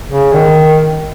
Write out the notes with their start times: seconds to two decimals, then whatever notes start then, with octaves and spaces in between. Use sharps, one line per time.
0.09 C#3
0.33 D#3